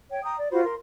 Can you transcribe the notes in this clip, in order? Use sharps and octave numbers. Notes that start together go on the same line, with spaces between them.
C#5 G5
G5 A#5 D#6
D5
F4 F#4 C5 B5
A#4 C6